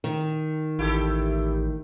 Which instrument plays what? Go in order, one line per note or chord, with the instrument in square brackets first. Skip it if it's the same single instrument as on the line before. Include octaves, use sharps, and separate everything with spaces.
[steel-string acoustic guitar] D#3
[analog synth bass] A1 [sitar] E4 G4 A4